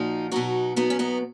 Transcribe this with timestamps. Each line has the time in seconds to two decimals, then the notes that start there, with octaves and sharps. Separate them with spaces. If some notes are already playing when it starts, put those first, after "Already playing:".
Already playing: A#2 F3 D#4 F#4
0.32 B2 F#3 D#4 F#4
0.76 B2 F#3 B3 D#4
0.90 C#4
0.99 B3 D#4